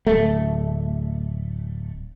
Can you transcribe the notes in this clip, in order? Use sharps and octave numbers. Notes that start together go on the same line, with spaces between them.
D1 A3